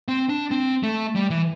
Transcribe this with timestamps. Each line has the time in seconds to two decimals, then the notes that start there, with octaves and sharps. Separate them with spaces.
0.08 C4
0.29 D4
0.51 C4
0.83 A3
1.15 G3
1.30 E3